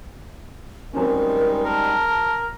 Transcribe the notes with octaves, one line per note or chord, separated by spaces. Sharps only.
F#2 G3 G#3 C4 C#4 D#4 A#4
A#4 A5